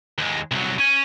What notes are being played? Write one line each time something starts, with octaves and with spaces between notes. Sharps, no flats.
D#2 G#3
C2 F#3
C#4 G#5 D#7